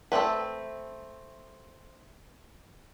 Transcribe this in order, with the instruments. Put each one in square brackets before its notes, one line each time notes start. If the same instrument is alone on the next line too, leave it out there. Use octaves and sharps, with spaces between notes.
[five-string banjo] A3 A#3 C4 B4